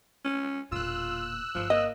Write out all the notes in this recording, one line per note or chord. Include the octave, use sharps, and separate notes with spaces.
C#4
E1 A#2 F4 E6 F#6
G1 F3
A#3 D#5